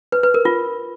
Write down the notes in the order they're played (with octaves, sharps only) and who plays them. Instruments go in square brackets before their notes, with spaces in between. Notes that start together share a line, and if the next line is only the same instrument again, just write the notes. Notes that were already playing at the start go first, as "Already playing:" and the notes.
[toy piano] B4
B4
A#4
F4